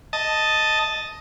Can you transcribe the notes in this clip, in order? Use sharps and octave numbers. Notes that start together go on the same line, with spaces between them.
D#5 A5